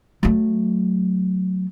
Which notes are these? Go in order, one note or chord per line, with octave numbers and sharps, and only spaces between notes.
F#3 A3